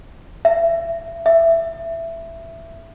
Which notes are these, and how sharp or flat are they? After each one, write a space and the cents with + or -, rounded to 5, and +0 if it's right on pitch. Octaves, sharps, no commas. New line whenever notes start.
E5 +25
E5 +10